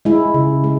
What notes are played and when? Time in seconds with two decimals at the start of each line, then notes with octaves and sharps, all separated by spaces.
0.05 G#3 E4
0.34 C#3
0.64 G#3